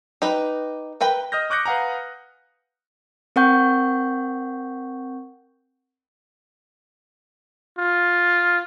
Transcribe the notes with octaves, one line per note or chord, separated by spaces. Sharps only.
D#4 G4 B4
A#4 B4 G5 B5
D#5 D#6 F6 G6 A#6
C#6 D6 F#6 G6 A#6 C#7
B4 F5 F#5 G#5 A#5
C4 A#4 F#5 G5 C#6 G6
F4